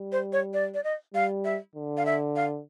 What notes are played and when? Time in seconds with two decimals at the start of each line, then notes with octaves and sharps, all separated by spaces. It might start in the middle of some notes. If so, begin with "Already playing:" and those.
Already playing: G3
0.12 C5
0.33 C#5
0.54 D5
0.74 D5
0.84 D#5
1.14 G3 F5
1.45 E5
1.75 D3
1.97 F5
2.06 E5
2.36 F5